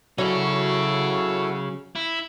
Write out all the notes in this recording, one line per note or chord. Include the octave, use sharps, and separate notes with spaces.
F#3 C#4 E4 F#4 G#4 A4
E4